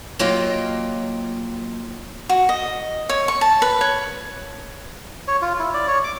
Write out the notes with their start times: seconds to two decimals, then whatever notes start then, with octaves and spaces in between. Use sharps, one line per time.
0.19 F#3 A#3 F4 G4 D#5 G5
2.29 F#4
2.49 D#5
3.09 C#5
3.28 C#6
3.41 A5
3.62 B4
3.81 C#5
5.28 C#5
5.42 F4
5.59 E4
5.74 D5
5.87 C#5
6.04 D6